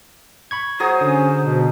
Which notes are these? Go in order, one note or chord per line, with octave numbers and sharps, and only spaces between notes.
B5 C#6 G#6
F#3 G#4 C5 D#6
D3 C#4
B2